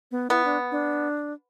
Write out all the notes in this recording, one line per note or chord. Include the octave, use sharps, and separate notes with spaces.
B3
B3 E4
D4
D4